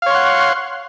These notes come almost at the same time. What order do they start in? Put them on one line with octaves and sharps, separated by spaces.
F5 C#5 C6 F#5